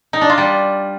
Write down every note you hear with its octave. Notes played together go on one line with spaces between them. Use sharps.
D#4
D4
F4
G3